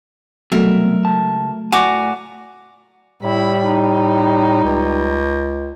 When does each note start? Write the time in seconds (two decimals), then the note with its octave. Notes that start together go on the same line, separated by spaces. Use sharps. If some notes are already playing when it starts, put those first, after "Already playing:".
0.52 C2 B2 F#3 A3 A#4 E5
1.05 C#2 A5
1.72 A2 F#4 D5 G#5 A#5 D6
3.23 A2 G3 E4 B5
3.67 D#4
4.64 C#2